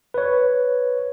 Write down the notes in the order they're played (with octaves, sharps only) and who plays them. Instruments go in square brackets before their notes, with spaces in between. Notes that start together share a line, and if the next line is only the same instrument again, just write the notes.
[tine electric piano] B4 C#5